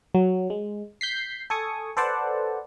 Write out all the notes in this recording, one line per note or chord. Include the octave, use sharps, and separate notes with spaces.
F#3
G#3
G6 B6 C7
A4 G#5 C#6 D#6
A4 B4 C5 D5 F#5 A5